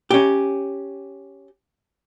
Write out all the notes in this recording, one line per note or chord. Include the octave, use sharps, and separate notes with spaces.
C#4 G4